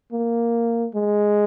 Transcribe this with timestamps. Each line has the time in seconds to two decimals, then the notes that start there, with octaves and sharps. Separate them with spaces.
0.13 A#3
0.94 G#3